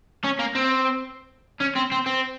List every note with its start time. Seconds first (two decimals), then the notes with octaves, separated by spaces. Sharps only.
0.24 C#4
0.39 A#3
0.55 C4
1.60 C#4
1.75 C4
1.92 C4
2.06 C4